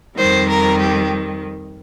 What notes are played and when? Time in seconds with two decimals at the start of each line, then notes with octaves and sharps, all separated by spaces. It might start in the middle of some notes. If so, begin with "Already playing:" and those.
0.17 F2 D#3 G3 C5
0.48 A#4
0.79 G4